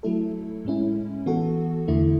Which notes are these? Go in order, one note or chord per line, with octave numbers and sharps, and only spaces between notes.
F#3 A3 E4 A4
A2 G#3 C#4 E4
E3 B3 F#4 A4
E2 D3 A3 E4